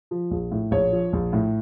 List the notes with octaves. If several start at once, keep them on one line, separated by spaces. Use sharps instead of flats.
F3
A#1
A2
A#1 C#5
F3
A#1
A2